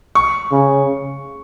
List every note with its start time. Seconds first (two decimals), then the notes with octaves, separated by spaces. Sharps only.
0.15 C#6
0.51 C#3